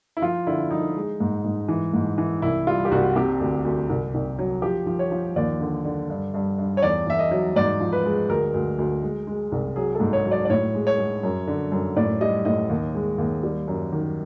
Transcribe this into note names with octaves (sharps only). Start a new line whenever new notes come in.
E4
F3 F4
D3 E4
F3 D#4
G#3
G#2
G#2
E3
G#2
E3
C2 E4
G3 F4
G4
C2 F#4
C3 G4
D2
D2
C2
C2
F#3
F3 G4
F3
C#5
F3
D#2 D5
D3
D3
G2
G2
G2
C#5
E2 D5
E2 E5
D#5
F#3
G#2 D5
F3
B4
G#3
D2 A#4
D2
D2
G#3
G#3
C2
F#3 G#4
A4
G#2
C#5
F#3
D5
D5
A2 C#5
G#3
C#5
G#3
F#2
D3
F#2
A2 D5
G3 D#5
A2 D#5
D#2
G#3
D#2
G3
F#2
D#3